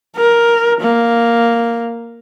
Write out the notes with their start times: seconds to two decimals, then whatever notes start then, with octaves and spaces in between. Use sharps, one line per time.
0.16 A#4
0.81 A#3